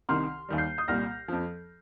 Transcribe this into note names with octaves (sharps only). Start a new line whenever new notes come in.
C2 C3 D#3 C6 F6
D#2 D#3 G3
G6 C7
D#6 G6
C2 A#2 G3 F6 A#6
F2 F3